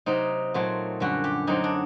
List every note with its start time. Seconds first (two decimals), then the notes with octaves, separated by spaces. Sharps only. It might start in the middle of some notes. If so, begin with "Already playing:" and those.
0.06 C3 F#3 C4 D#4
0.54 A#2 F#3 A3 C4
1.00 F#2 D3 G3 F#4
1.24 G4
1.47 D3 F#3 C4 D#4
1.64 D4